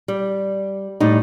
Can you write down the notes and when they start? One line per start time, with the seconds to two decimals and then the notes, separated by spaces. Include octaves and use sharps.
0.08 G3
1.00 A2 G3 D#4